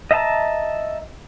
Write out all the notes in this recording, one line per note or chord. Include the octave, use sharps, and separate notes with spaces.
D#5 E5 F#5 A5 A#5